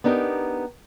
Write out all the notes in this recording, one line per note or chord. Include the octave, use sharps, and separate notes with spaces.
B3 D4 D#4 G4 A4 A#4